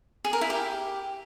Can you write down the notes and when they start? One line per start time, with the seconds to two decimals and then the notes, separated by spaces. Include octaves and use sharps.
0.24 G#4
0.33 A#4
0.41 E4
0.50 G4